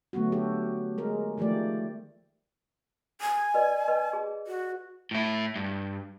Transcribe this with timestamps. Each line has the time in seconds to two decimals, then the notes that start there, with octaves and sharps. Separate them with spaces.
0.13 D3 F#3 A3 B3 F#4
0.32 F#4 G4 A4
0.98 G#3 A#4
1.38 D#3 F3 A3 G4 D5
3.21 G#5
3.54 B4 D5 D#5
3.88 B4 D#5
4.13 G#4
4.47 F#4
5.11 A2 E4
5.56 G2